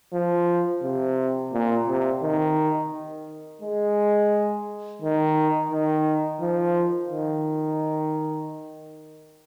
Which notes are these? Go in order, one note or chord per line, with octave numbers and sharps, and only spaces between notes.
F3
C3
A#2
C3
D#3
G#3
D#3
D#3
F3
D#3